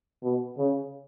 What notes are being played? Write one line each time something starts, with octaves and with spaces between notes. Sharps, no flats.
B2
C#3